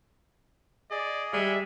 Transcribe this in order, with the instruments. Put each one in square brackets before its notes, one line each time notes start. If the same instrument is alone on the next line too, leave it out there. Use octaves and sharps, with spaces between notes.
[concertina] G#4 D#5 [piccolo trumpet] D5
[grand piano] G3 [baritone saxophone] G#3 [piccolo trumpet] E5